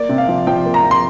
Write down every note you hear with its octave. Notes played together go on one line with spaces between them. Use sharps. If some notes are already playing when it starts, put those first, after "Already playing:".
Already playing: A#3 D5
C3
F5
F3
F3 G5
A#3
A#5
F3
C6